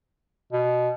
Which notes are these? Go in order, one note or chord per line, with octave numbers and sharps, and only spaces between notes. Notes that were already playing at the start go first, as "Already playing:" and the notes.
B2